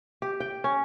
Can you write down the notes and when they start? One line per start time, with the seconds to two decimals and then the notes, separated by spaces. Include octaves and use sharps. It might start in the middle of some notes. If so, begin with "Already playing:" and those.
0.22 G4
0.40 G5
0.64 C#4